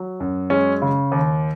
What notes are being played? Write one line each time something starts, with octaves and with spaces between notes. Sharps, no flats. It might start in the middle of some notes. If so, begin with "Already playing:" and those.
Already playing: F#3
F#2
G#3 C#4
C#3
D#2